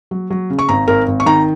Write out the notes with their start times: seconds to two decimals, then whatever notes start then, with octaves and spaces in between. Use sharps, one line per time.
0.11 F#3
0.30 F#3
0.50 C#3
0.59 C#6
0.69 G#1 A#5
0.88 G#1 A#4
1.08 G#1
1.20 C#6
1.26 D#3 A#5